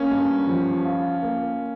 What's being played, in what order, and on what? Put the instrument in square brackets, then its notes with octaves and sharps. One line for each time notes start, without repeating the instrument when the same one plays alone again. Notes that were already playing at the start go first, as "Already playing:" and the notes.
Already playing: [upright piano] A#3 [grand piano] C#4
[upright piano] G2
F3
F4
A#3